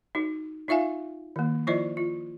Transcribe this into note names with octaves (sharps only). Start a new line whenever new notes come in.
D#4 F#4
D#4 F4 E5 F5 G#5
D#3 A#3
F3 E4 F4 C5 D5 D#5
F4